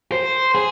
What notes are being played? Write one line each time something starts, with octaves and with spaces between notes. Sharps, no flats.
C5
G#4